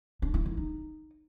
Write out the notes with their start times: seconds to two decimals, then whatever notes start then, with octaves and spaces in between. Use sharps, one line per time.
0.22 D4
0.34 E4
0.46 D#3
0.57 D#4